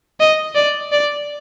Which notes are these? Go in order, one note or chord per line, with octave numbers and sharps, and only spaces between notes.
D#5
D5
D5